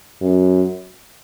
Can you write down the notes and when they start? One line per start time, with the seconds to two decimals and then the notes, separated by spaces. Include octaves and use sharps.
0.22 F#2